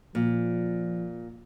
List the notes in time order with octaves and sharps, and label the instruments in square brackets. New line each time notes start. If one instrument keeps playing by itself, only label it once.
[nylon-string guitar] A#2 [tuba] F3